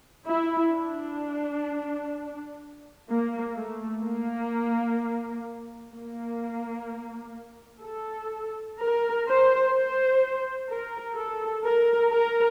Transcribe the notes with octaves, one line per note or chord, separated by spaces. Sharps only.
E4
D4
A#3
A3
A#3
A#3
A4
A#4
C5
C5
A#4
A4
A#4
A#4